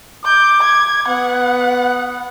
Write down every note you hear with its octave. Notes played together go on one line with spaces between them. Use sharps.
D6 G6
G#6
B3 F#5